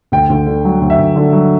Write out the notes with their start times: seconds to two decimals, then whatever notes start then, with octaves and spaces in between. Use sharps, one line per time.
0.12 D2 G5
0.30 D2
0.47 D3
0.65 F#3
0.81 D2
0.90 E5
0.98 D2
1.16 D3
1.33 F#3